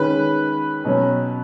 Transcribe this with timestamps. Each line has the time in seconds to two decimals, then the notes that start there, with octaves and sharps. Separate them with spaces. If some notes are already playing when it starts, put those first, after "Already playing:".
Already playing: D#3 G#3 C#4 B4
0.85 B2 F#3 C#4